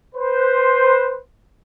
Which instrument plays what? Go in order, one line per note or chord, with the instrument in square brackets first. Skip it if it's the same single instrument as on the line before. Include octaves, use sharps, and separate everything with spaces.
[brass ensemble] B4 C5